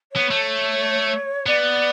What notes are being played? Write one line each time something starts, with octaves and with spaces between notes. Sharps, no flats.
B3 C#5
A3
B3 D5